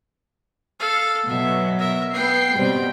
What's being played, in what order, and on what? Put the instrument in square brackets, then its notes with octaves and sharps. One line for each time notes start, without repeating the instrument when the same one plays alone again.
[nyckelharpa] A4 F5
[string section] B2 F#3 [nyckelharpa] E5
[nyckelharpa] A#4 E5
[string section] B3 C7 [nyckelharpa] G5
[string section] B2 G3 C4